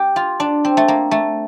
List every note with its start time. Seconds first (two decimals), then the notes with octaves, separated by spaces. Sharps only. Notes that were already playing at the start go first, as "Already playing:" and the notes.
Already playing: G4
0.16 F4
0.40 D4
0.65 C4
0.77 A3
0.88 A#3
1.11 A3